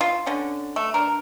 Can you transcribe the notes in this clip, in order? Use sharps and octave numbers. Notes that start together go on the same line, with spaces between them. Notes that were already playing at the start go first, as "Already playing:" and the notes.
F4
D3 C#4
A3
D4 A#4